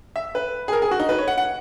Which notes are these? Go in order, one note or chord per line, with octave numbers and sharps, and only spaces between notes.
E5
B4
G#4
A#4
G#4
F#4
D#4
B4
C#5
F#5
F#5